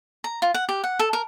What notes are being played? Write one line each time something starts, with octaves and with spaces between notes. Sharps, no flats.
A#5
F4
F#5
G4
F#5
A4
A#4